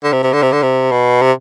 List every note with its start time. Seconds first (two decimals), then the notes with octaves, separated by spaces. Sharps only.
0.04 D3
0.13 C3
0.23 C3
0.33 D3
0.43 C3
0.53 D3
0.62 C3
0.92 B2
1.22 C3